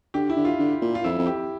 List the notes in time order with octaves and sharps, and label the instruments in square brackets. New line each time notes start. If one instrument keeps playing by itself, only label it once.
[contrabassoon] D3 [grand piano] G4
[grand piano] E4
[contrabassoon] D3
[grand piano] F4
[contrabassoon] D3
A#2
[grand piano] F4
[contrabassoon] F2 [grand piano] E4
[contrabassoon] F2
[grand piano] G4